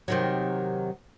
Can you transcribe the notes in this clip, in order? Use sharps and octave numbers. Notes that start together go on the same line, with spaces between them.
C3 D#3 F#3